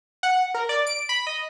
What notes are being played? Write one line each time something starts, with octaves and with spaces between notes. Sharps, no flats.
F#5
A#4
D5
D7
B5
D#5